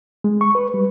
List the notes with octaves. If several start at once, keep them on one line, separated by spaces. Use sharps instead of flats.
G#3
C#6
B4
G3